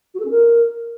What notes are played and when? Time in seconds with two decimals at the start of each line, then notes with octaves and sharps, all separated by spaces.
0.14 F#4
0.19 A4
0.25 C#4
0.30 A#4